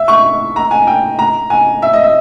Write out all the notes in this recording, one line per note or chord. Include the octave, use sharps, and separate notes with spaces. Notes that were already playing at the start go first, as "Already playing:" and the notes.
Already playing: E5
C#6
A#5
G#5
G5
A#5
G#5
E5
D#5
E5